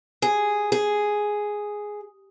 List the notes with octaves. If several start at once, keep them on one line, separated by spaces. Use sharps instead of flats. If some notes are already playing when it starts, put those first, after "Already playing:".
G#4
G#4